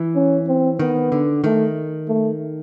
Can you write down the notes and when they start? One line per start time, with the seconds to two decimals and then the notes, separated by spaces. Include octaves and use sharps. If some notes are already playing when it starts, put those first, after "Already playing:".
Already playing: E3
0.15 C#4
0.47 C4
0.79 D#3 B3
1.12 D3
1.44 D#3 A3
2.08 A3